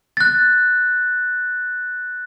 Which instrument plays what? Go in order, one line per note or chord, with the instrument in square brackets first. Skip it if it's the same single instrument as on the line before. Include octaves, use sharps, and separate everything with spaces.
[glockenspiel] F#6 A6